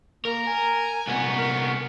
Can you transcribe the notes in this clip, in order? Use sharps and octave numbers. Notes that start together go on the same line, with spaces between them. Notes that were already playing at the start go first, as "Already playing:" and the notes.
A#3 A#4
G#5
C2 B3
A#4